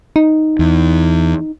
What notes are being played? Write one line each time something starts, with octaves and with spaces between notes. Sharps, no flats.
D#4
E2